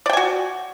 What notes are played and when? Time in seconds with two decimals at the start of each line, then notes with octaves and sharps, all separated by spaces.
0.06 D5
0.09 G5
0.13 G#5
0.17 F#4